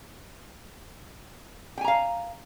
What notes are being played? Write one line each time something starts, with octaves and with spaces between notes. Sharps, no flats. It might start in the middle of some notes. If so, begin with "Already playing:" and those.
F5 G5 G#5 A#5